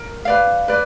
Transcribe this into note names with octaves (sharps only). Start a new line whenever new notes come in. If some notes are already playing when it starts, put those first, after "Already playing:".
Already playing: A#4
B4 D5 F5
B4 D5